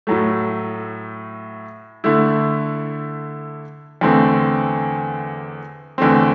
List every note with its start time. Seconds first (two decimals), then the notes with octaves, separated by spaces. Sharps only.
0.07 A2 F#3 A3
2.04 D3 A3 E4
4.01 E2 D3 A3 C4
5.98 E2 D3 A3 C4